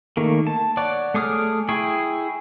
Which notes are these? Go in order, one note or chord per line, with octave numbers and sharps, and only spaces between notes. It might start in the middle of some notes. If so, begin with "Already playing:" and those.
D#3 A3 A#3
A5
C#5 D5 F#5 D6
A3 G#4 D6 D#6 F6
E4 G#4 G5 C#6